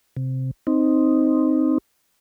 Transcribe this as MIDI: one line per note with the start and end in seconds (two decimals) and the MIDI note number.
0.17 0.51 48
0.67 1.78 60
0.67 1.78 63